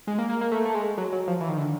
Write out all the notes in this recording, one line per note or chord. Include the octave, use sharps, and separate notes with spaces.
G#3
A#3
A#3
A#3
A3
A3
G#3
F#3
F#3
F3
E3
D#3
D3